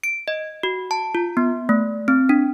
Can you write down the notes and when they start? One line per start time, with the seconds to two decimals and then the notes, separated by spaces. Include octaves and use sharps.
0.04 D7
0.28 D#5
0.63 F#4
0.91 A5
1.15 F4
1.37 B3
1.69 A3
2.08 C4
2.29 D4